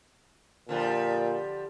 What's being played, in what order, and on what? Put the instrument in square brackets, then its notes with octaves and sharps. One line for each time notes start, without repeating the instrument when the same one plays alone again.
[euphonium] A#2 [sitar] D3 F3 G3